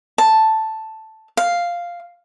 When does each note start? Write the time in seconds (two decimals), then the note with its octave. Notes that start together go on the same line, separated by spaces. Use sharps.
0.18 A5
1.37 F5